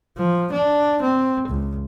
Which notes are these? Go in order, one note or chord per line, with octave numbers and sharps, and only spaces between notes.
F3
D4
C4
C#2